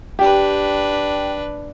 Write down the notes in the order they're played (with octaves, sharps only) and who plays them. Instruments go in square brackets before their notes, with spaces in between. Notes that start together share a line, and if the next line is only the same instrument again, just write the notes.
[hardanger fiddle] D4 B4 [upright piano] G4